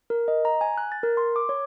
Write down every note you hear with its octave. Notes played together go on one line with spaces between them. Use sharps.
A#4
D#5
A#5
G#5
F#6
A6
A#4
C6
D6
C#5